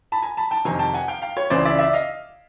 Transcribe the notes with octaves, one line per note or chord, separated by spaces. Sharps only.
A5 B5
G#5 A#5
A5 B5
G5 A5
F2 C3 D#3 G#5 A#5
G5 A5
F#5 G#5
F5 G5
F5 G5
C#5
C#2 C#3 E3 C5 D5
D5 E5
D5 E5
D#5 F5